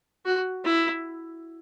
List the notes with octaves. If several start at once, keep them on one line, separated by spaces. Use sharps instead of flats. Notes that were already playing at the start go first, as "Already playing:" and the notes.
F#4
E4